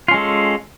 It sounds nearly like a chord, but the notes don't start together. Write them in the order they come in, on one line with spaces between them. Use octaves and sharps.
F4 C#4 G#3 A4